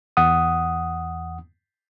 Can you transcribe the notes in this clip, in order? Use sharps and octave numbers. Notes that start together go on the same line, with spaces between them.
E2 F#5 D#6